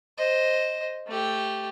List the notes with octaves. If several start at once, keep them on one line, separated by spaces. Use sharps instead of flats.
C5 D#5
A3 G4